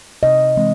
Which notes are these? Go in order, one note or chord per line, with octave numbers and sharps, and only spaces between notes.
C3 D#5
E3 G#3 C4